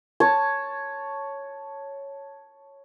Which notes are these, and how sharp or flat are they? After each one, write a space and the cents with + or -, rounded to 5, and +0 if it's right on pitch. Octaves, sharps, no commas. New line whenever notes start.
C#5 +0 A5 +0